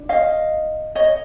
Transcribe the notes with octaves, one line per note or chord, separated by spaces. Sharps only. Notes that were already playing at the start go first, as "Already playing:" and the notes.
Already playing: D4
D#5 F5
C#5 D#5